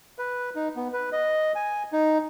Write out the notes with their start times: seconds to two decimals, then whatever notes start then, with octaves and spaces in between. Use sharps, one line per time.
0.19 B4
0.55 D#4
0.76 B3
0.93 B4
1.13 D#5
1.55 G#5
1.93 D#4